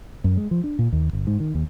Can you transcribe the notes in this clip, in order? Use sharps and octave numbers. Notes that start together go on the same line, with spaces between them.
F#2
G#3
F3
D4
A#2
D#2
G1
G#2
D#3
D#2